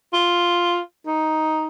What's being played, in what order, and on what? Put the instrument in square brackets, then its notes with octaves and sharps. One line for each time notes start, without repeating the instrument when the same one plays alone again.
[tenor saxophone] F4
D#4